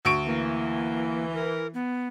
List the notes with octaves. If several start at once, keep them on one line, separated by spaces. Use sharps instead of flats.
D2 C#6 D7
E3 A#3
A#4
B3